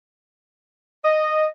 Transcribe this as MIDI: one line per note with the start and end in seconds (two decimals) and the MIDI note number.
1.05 1.45 75